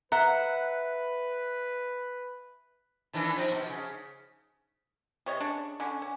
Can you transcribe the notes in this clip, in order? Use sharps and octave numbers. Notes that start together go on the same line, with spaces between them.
B4 E5 F#5 A#5
D#3 E3 D4
F3 C4 D#4
B2
C#3
C3 C#5 D#5
C#3 D4 C#6
D3 C#4 D4
C#4